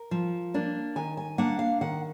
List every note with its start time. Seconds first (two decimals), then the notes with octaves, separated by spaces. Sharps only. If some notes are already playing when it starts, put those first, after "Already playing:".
Already playing: A#4
0.11 F3
0.54 A#3 D4
0.96 D#3 G#5
1.17 G#5
1.38 A#3 D4 F#5
1.59 F5
1.81 D#3 F#5